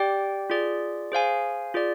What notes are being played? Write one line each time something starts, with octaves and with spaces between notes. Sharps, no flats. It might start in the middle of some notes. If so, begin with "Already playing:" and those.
Already playing: G4 D5 G5
F4 G#4 D5
G#4 C5 F5 G#5
F4 G#4 D5